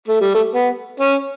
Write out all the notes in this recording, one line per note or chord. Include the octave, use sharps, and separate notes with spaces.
A3
G3
A3
B3
C#4